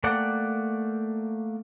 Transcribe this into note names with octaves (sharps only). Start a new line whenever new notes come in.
A3 A#3 D5 F#5 G5